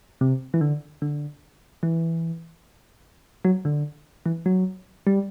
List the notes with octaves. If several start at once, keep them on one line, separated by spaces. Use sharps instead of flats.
C3
E3
D3
D3
E3
F#3
D3
E3
F#3
G3